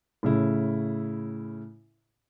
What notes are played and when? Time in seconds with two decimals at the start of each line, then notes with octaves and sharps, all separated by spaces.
0.23 A2 C#3 E4